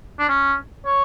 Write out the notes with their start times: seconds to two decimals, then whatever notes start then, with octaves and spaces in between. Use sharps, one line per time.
0.19 D4
0.29 C#4
0.86 C#5